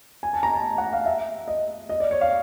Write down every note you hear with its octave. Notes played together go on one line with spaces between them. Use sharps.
G#5
A5
A#5
A5
F#5
F5
E5
D#5
D#5
D5
C#5
F5